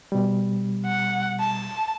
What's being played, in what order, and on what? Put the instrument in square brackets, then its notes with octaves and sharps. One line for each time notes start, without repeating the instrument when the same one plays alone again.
[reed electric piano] B2 G3
[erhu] F#5
A5